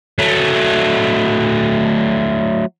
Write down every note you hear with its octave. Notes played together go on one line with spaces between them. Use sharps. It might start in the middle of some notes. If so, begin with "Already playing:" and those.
F#3 A3